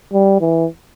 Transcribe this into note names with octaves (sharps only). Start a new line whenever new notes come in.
G3
E3